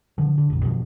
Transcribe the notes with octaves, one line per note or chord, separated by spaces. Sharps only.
D3 F3
D3
F1 A#1
G2 B2 F3